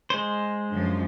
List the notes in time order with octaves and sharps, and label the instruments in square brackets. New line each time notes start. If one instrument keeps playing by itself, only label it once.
[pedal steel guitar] G#3 C5
[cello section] F#2 D3 F3